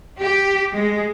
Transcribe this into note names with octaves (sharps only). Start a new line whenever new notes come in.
G4
G#3